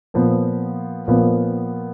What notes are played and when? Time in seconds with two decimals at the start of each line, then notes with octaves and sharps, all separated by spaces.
0.14 A#2 F3 B3
1.08 A#2 F3 B3